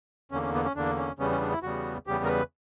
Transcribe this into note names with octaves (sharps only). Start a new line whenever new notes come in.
E2 D3 A#3 C#4
C#4
B3
C#4
E2 D3 A#3 D4
C#4
E2 C#3 G3 B3 C#4
C#4
D4
E4
E2 C#3 G3 B3 F#4
E2 C#3 G3 B3 G4
A#4
B4